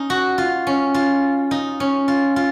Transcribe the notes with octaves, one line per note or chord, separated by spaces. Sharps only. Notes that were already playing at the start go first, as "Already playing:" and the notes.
Already playing: C#4 D#4
F#4
F4
C#4
F4
D#4
C#4
F4
F4